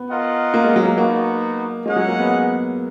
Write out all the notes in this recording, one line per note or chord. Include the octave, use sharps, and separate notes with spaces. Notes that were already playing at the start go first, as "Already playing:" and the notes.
Already playing: B3
F4 A#4 D#5 F#5
A#3
G#3
F#3
A#3
A#3 B3 D#4 F#4
G#3 C#4 G#4 D#5 F#5
F#3
A#3
B3
B3